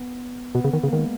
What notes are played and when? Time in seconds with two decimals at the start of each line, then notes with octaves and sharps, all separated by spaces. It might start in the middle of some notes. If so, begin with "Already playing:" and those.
Already playing: B3
0.55 B2 B3
0.64 C#3
0.73 D#3
0.83 C#3
0.88 A#3
0.93 D#3 G#3